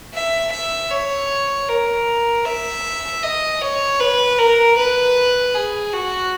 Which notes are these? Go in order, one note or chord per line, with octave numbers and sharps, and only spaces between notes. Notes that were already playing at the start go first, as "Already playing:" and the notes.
E5
E5
C#5
A#4
E5
D#5
C#5
B4
A#4
B4
G#4
F#4